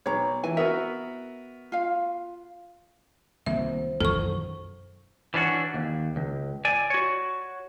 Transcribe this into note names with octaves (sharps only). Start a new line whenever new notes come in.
B1 C#5 A#5
E3 G#5
B3 F#4 A#4 E5
F4 F5
C2 D#3 F3 A#3 B3 E5
B1 F#2 D#3 E3 A4 C#6
E3 C#4 D4 F#4
D#2
C#2
D5 G#5
F#4 C#5